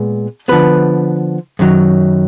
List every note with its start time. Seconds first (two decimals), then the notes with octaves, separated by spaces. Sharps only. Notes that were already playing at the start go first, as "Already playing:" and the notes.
Already playing: A#2 G#3 B3
0.48 D3 F3 B3 B4
1.59 F#2 D#3 F#3